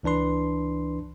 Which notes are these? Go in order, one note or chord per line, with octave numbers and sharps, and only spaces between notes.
C#2 E3 D4 B4 C6